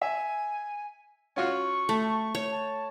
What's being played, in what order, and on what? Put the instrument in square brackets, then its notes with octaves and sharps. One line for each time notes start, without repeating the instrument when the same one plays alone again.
[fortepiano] E5 [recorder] G#5
[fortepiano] C#4 F4 F#4 [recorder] C#6
[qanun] A3
C#5
[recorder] A5